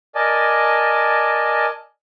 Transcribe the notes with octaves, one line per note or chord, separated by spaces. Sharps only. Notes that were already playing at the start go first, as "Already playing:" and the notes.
A#4 D5 D#5 G#5 A5